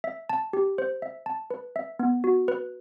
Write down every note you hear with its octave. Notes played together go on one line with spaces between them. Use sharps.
E5
A5
G4
C5
E5
A5
B4
E5
B3
F#4
B4